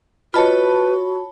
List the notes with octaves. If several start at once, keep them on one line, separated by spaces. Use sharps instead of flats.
F4 F#4 B4 C#5 D#5 A5 B5